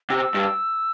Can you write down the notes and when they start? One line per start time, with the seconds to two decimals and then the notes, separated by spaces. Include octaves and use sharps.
0.10 C3 E6
0.34 G2